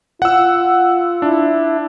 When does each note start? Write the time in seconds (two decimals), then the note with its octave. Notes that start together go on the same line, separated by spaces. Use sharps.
0.22 F4 F#5 E6
1.22 D4 E4